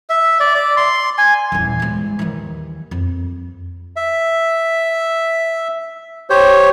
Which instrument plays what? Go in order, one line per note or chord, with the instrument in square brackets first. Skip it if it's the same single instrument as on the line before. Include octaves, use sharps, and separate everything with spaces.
[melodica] E5
D5
D5
C6
G#5
[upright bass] D#1 E2
E2 G#2
D#2 E3
F2
[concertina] E5
G4 C5 C#5